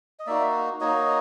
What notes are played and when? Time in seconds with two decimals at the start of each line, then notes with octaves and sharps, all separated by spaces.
0.19 D#5
0.27 A#3 D#4 F#4 D5 E5
0.80 A#3 D#4 F#4 C#5 D#5